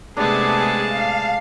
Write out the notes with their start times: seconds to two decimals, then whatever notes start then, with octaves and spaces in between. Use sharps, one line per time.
0.17 C3 G#3 A3 B3 D4 G#4 A5
0.92 F5